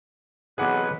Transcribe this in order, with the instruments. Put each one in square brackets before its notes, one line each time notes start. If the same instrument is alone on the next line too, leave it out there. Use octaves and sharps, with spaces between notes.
[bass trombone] B1 [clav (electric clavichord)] C3 E3 B3 [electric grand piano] G#4 F#5 D6 [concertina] B4